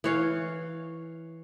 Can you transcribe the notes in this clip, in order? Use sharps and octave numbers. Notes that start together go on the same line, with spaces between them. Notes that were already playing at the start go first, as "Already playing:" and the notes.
E3 C#5 F5